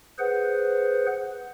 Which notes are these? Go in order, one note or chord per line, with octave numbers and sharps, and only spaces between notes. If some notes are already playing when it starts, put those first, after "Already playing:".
G#4 B4 C5 F#5